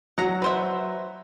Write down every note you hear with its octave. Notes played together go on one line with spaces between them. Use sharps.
F#3 F#5 A#5
B4 C5 E5